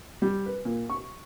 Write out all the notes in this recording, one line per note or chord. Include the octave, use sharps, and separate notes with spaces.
G3
B4
A#2
C#6